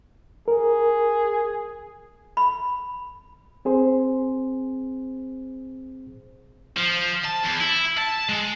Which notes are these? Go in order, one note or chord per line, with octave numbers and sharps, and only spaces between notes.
G#4 A#4
B5
C4 G#4 C5
F3
A5
E2
E4
A5
G#3